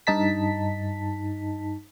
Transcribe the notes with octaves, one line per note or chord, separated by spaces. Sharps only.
G2 D#4 A5 B6